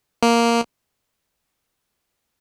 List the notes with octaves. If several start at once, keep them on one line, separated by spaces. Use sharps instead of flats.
A#3